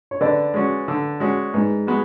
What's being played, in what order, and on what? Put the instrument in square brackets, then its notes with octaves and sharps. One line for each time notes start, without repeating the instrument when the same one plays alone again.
[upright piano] C#5
[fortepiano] D3 [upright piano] B4 D5
[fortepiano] G#3 C#4 F#4
D3
G#3 C#4 F#4
[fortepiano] G#2 [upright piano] G#4 B4
[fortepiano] G#3 B3 F#4